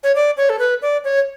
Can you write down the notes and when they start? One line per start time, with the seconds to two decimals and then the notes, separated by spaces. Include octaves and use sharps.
0.04 C#5
0.15 D5
0.37 C#5
0.50 A4
0.59 B4
0.82 D5
1.04 C#5